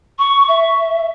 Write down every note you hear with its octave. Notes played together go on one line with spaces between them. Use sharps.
C#6
E5